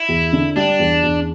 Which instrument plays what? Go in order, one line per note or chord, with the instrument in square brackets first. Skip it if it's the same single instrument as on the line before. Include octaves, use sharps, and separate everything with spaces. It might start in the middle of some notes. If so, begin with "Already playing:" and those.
Already playing: [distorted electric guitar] E4
[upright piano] E2
D3
[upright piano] G3 [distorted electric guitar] D4
[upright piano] E2
E2